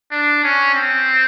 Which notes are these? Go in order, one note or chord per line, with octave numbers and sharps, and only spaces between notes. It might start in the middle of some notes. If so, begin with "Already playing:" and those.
D4
C#4
C4